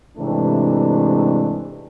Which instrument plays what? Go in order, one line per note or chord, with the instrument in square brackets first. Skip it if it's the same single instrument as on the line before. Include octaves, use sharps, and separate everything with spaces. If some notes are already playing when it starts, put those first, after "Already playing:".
[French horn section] G#2 C3 E3 A3 D4